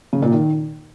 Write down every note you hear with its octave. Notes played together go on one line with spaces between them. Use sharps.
C#3
A#2
D#3